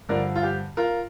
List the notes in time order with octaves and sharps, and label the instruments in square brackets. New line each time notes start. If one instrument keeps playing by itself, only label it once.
[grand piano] G2 D3 F3 A#4 D5
F4
G4
F4 A#4